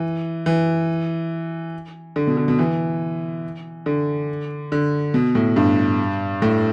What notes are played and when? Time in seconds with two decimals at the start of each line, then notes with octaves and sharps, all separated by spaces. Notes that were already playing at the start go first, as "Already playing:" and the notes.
Already playing: E3
0.46 E3
2.16 D3
2.27 B2
2.37 D3
2.48 B2
2.59 E3
3.86 D3
4.72 D3
5.14 B2
5.35 A2
5.56 G2
6.42 A2